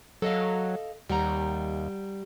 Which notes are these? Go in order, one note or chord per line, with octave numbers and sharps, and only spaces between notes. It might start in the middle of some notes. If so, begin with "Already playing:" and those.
F#3 A4 D#5 F5
D#2 G3 F#5 A#5